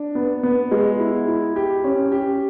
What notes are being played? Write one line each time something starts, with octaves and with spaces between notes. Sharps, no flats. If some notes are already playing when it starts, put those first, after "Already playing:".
Already playing: D4
B3
B3
G#3
E4
E4
G4
C#4
G4